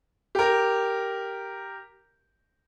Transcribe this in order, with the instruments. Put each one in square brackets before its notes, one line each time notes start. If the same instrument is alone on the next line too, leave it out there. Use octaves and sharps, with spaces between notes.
[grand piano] G4 A#4